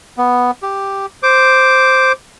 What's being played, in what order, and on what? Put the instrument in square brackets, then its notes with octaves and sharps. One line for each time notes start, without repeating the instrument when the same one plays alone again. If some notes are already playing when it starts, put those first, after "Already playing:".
[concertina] B3
G4
C5 D6